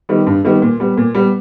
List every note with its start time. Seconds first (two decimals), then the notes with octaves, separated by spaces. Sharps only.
0.09 D#3 G3 B3
0.27 G2
0.45 D#3 G3 B3
0.62 A#2
0.80 G3 B3
0.97 A#2
1.15 G3 B3